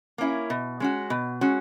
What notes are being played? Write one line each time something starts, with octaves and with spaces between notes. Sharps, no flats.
A#3 C#4 E4
B2
G#3 C#4 F#4
B2
G#3 C#4 F#4